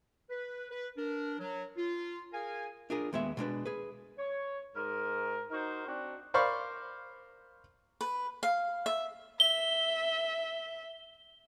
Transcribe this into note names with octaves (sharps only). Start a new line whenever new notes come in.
B4
B4
D4 A#4
F#3
F4
G#4 A#4 F5 G#5
D4 F4 G#4 A#4
D#2 G#3 B3 E5
B2 G#3 D4 B4
G#4 B4
C#5
G#2 A#4
D#4 F#4 A#4 C5
C4 D4 F#4
A#4 C5 D5 F5 B5 C#6
B4
F5
E5
E5 G7